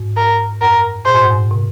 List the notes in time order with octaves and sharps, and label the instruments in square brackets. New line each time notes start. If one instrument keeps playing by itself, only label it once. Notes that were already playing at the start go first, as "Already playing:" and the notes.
Already playing: [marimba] G#2
[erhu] A#4
[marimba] F#2 [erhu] A#4
[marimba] A#2 [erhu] C5
[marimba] G#2
F#2
G#2
C3